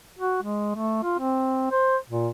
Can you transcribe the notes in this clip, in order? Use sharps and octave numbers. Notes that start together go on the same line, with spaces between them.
F#4
G#3
A3
F4
C4
C5
A#2